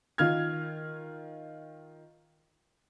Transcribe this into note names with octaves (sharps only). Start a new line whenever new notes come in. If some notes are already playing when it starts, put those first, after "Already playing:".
D#3 F4 F6 G#6